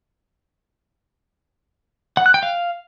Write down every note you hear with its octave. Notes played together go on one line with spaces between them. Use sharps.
F#5
F#6
G5
F5